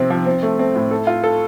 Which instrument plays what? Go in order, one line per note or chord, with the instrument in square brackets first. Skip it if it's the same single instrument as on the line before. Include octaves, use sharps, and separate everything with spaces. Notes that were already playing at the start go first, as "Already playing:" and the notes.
Already playing: [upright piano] C3 F3 C4
F3
C4
A3
C4
A2
A4
F4
A4